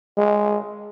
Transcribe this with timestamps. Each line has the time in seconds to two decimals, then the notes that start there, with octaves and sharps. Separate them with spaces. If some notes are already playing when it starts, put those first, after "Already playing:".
0.18 G#3